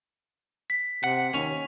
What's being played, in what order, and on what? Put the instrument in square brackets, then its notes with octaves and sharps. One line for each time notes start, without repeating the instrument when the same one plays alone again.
[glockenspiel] B6
[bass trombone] C3 [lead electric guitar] F#5
[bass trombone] D#2 [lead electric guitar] C#4 [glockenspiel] F7